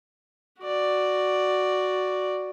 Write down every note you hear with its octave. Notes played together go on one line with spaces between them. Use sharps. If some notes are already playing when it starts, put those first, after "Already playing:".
F#4 D5